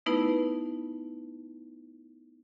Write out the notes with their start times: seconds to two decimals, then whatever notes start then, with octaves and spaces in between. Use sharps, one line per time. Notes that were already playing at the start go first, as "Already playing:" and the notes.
0.06 A3 B3 D#4 E4 B4